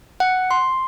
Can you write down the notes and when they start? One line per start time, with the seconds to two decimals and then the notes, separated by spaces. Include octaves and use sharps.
0.20 F#5
0.51 C6